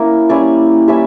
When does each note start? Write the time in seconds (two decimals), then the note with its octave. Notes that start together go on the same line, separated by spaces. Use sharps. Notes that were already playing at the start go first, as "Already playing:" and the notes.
Already playing: A#3 C#4 E4 A#4
0.29 G3 C#4 E4 D5
0.88 G3 C#4 E4 E5